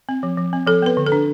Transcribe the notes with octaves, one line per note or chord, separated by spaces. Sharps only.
C4
F3
F3
C4
F3 A4
B3 B4
D3
A4
D4